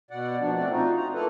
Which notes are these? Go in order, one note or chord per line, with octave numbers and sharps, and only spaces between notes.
B2 D5 F#5
A#2 F3 D4
A3 C4 D5
D#4 F4 F#4
A#5
A#3 E4 A4 B4